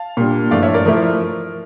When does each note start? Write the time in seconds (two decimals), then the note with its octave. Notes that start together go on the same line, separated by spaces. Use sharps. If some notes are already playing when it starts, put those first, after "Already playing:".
Already playing: F5 A5
0.17 A#2 G3 D4
0.51 G2 F3 A3 E4 D5 F5
0.63 C#5 E5
0.74 A#4 D5
0.86 F3 A3 E4 A#4